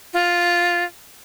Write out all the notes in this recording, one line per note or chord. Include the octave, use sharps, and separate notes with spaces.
F4